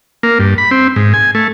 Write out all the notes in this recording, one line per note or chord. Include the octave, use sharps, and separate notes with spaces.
A#3
G2
B5
C4
G#2
G#5
A3